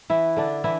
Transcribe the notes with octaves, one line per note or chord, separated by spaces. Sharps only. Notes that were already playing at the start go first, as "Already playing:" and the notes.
E3 E4
D3 D4
E3 E4